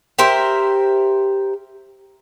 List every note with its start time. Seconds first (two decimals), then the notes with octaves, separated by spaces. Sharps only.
0.19 G4 A#4 C5 E5